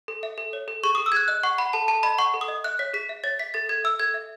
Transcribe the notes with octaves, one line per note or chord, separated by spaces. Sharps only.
A4
E5
A4
C#5
A4
G#4 C#6
G#4 D#6
E6
G#4 F#6 G#6
D#5 F#6
F#5 C#6
F#5 B5
A4 A5
A4 A5
D#5 B5
F#5 C#6
A4
D#6
D#5
E5 F#6
C#5 B6
G#4 B6
E5
C#5 A6
E5 B6
A4 A6
A4 G#6
E5 E6
A4 G#6
E5